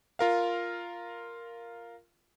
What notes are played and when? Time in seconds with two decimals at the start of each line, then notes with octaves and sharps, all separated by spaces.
0.19 F4 A#4 F5